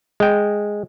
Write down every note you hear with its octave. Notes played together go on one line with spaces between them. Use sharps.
G#3 G5